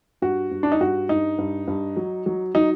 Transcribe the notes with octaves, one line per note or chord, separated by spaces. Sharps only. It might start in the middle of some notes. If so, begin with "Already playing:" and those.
G2 F#4
G2
D4
D#4
G2 F#4
G2 D#4
G2
G2
F#3
F#3
F#3 D#4